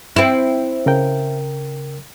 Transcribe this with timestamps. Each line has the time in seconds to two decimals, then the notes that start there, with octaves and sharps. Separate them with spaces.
0.16 C4 E4
0.86 C#3 A#4 G5